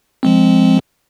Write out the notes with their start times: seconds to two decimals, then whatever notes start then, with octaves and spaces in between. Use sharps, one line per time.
0.23 F3 G#3 C4